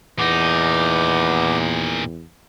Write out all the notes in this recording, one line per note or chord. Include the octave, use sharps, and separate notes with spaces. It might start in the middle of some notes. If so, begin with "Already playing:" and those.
E2 A#2 B3 D#4 D6